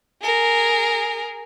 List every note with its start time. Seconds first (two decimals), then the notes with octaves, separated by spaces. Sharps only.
0.22 G#4 A#4